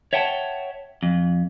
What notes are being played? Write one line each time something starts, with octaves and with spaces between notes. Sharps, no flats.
C#5 E5 F#5 G5 A5
F2